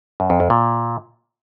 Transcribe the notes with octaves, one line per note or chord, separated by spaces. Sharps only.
F#2
F2
F2
A#2